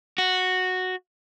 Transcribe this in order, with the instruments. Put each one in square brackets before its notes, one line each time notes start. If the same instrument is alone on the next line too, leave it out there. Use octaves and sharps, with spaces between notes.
[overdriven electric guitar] F#4